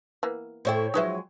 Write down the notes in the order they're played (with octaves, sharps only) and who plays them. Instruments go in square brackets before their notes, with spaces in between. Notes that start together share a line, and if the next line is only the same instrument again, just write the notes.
[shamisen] E3 A#3 B3
[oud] A2 E4 A4 [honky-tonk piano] C5 C#5 G5
[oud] F3 F#3 G#3 [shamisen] D#4 B4 E5